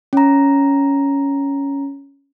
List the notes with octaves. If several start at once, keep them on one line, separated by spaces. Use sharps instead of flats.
C#4 A#5